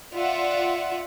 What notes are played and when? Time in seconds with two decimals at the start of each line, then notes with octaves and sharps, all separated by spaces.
0.14 F4 D5 E5 F#5